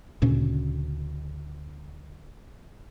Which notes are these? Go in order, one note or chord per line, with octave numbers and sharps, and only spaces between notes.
D2 A#2 C#3 C#4